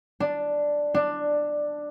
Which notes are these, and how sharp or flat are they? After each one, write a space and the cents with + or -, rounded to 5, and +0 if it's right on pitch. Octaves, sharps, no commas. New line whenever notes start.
D4 +0
D4 +10